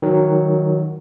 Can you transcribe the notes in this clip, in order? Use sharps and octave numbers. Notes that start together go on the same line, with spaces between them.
D#3 F#3